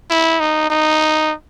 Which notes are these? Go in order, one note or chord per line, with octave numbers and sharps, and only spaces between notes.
E4
D#4
D#4